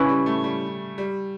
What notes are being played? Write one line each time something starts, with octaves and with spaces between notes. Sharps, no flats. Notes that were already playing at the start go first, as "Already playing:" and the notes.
Already playing: C#3 C#4 E4 B4
G3
A3
G3
G3